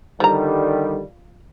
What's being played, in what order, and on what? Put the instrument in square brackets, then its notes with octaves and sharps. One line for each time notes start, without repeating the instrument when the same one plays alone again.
[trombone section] D3 D#3 G3 [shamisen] F3 A#5